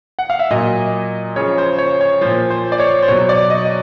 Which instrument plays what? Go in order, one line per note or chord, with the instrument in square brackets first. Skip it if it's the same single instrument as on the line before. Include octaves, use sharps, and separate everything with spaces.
[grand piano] F#5
F5
E5
A#2 F#3 D#5
C#3 F3 C#5
C5
C#5
C#5
A#2 F3 C5
C5
D5
C#5
C5
B2 F#3 C#5
D5
D#5
D#5